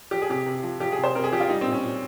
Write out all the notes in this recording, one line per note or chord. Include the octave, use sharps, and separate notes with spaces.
F3 G4
G#4
C3 G4
C3
F3
F3 G4
G#4
C3
C5
C3 A#4
G#4
F3 G4
F4
G3 D#4
C4
A#2
C#4
A#2